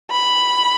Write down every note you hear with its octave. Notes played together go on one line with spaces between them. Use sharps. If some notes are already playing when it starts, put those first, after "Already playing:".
B5